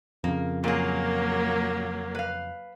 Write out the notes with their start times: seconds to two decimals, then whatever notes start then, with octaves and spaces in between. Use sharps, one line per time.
0.24 F2 C#3 A#3
0.64 A#2 F#3 A#3 G#4 A#4
2.15 B4 F5